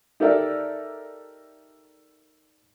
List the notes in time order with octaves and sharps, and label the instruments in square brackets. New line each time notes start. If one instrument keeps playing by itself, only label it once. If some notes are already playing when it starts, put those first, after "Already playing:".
[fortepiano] D#4 G4 A4 A#4 D5 E5